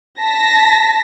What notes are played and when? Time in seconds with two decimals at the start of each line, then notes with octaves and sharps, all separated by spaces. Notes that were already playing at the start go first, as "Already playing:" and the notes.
0.20 A5 A#6 B6